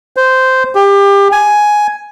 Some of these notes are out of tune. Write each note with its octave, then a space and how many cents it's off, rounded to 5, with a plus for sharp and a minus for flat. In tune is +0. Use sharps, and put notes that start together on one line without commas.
C5 -10
G4 +25
G#5 +10